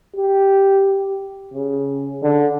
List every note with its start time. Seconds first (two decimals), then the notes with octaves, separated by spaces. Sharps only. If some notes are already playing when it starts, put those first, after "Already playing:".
0.16 G4
1.54 C#3
2.23 D3